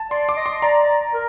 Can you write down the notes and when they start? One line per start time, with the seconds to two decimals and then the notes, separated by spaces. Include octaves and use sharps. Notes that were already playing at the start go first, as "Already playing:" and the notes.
Already playing: A5
0.10 D5 C6
0.29 D6
0.37 D#5
0.46 C6
0.62 D5 A#5
1.13 A#4